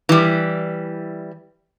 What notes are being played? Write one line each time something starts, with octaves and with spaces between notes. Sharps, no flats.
E3 G3